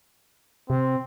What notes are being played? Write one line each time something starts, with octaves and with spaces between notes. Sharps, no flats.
C3 C4